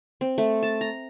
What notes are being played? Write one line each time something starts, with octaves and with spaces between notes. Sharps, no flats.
C4
A3
A5
A#5